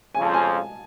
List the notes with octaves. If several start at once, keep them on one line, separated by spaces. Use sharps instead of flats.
F2 C#3 F3 G#5
A5
G#5